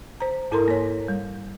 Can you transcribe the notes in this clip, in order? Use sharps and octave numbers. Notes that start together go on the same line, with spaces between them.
C5 A#5
G#2 E4 A4 A#4 A#5 C6
A#3 C#5
G3